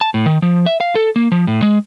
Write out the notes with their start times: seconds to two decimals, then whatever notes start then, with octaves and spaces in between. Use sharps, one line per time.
0.01 A5
0.14 A2
0.26 D#3
0.42 F3
0.66 E5
0.80 F5
0.95 A4
1.16 A#3
1.32 F3
1.47 A2
1.62 G#3